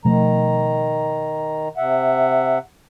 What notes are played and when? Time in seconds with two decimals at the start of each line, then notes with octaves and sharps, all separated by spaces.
0.05 B2 D#3 F3 A3 A#5
1.77 C3 E5 F#5